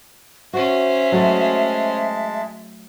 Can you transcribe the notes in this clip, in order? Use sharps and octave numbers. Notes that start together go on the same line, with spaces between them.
C#4 F#4 C5 E5
F#3 G#3 A3 A5